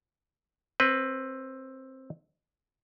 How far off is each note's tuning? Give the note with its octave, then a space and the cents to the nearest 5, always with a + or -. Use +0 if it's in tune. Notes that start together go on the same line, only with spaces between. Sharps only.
C4 +15 B4 +0